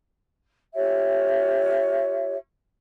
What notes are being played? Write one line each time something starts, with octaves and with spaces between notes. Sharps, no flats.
F4 G4 C#5 E5